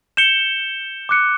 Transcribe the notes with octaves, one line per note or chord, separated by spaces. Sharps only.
G6 C#7 E7 G7
D6 F#6 C#7